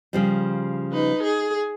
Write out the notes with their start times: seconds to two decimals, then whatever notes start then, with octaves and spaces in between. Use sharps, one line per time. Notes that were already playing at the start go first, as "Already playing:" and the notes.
0.13 C#3 F3 G3
0.92 D#4 B4
1.23 G#4